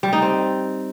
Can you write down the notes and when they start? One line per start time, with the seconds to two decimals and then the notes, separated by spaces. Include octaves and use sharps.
0.03 G3
0.13 D#4
0.22 C4